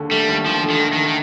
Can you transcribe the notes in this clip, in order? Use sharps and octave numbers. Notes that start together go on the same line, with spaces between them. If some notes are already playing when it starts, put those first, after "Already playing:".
Already playing: D#2 D3
G3 A3
D#2
D#2 F3
D3
D#3
A3
D#3
D#3